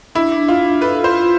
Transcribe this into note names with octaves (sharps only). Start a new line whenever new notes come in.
D4 E4
D4
D4 F4
D4
A4 B4
F4
C5
F4